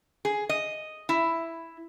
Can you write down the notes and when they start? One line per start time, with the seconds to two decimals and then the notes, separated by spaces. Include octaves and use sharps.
0.25 G#4
0.49 D#5
1.09 E4